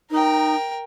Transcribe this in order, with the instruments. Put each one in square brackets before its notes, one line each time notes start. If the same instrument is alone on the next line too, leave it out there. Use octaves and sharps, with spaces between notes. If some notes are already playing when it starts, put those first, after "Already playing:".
[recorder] D#4 [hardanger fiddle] A#4 G5